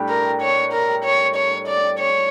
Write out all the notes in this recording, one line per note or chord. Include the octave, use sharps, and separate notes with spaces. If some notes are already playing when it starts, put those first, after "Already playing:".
Already playing: A2 G3 D4 G4
A#4
C#5
A#4
C#5
C#5
D5
C#5